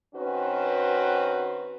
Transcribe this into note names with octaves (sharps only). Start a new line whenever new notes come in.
D#3 C4 C#4 F#4 B4